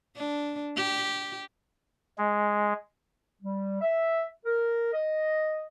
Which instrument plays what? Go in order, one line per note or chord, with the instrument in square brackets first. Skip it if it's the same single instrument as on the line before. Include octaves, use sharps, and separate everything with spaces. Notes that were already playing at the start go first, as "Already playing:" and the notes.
[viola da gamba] D4
G4
[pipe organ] G#3
[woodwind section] G3
E5
A#4
D#5